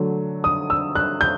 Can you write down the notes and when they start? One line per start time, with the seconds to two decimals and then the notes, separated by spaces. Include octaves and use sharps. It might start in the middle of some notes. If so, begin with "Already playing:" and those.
Already playing: D3 F#3 A3
0.44 D#6
0.70 E6
0.95 F#6
1.21 G6